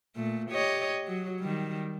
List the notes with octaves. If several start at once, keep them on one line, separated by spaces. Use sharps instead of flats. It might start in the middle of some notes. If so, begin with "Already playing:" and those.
A#2 A3
G4 C#5 D#5
F#3
D#3 G3